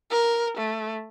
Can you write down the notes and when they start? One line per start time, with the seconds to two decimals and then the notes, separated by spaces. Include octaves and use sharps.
0.11 A#4
0.57 A3